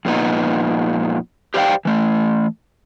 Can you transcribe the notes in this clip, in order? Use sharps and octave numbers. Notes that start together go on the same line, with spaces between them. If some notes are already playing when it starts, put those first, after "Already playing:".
F2 A#2 B3 D#4
G4 C5 D5 F5 G5
E3 A3